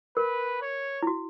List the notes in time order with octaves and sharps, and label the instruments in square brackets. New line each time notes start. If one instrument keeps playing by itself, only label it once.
[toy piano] A#4 [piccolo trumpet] B4
[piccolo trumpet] C#5
[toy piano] E4
F#4